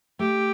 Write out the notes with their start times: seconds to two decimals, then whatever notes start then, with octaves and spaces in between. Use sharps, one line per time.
0.19 A3 G4